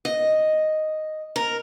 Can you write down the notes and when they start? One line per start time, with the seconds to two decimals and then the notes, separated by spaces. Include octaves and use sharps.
0.05 D#5
1.36 A#4